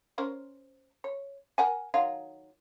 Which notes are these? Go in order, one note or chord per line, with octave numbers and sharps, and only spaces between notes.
C#4 A#4 C5
C#5
A#4 F#5 G#5
D#3 F#3 F4